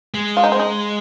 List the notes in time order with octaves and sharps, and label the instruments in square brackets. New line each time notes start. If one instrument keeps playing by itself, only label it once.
[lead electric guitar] G#3
[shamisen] F4
D#4
C4
D#4